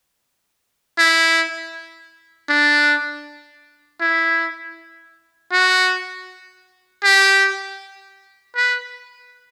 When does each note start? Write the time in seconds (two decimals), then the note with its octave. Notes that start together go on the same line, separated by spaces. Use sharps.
0.98 E4
2.49 D4
4.01 E4
5.53 F#4
7.04 G4
8.56 B4